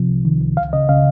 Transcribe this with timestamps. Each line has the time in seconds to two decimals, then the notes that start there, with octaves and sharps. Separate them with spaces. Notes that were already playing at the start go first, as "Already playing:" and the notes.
Already playing: C3 F3
0.09 C2
0.25 D#3
0.41 C2
0.57 C#2 F5
0.73 C#3 D#5
0.89 C#3 F5